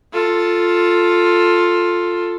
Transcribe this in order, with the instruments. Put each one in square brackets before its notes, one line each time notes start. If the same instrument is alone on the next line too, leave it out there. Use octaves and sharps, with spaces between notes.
[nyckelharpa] F4 A4